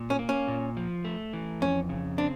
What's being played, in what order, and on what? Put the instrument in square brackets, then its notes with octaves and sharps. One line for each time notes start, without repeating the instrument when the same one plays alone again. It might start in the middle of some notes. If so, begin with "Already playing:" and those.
Already playing: [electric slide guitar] A#2
[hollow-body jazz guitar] C#4
[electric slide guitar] A#3
[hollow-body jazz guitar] C#4
[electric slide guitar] A#2
F3
A3
E3
[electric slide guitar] F2 [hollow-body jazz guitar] C#4
[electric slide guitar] C#3
[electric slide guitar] C4 [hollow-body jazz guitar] D4